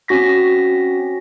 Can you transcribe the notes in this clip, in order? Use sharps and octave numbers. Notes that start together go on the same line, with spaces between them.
C4 C#4 F#4 A#6 B6